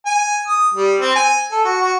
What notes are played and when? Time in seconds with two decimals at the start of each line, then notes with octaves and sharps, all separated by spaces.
0.06 G#5
0.48 D#6
0.74 G3
1.00 C4
1.15 G#5
1.51 A4
1.65 F#4
1.81 F#4